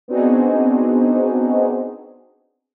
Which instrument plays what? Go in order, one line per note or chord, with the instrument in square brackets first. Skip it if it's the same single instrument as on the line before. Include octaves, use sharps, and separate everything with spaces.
[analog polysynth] B3 C4 D4 D#4 F#4 G#4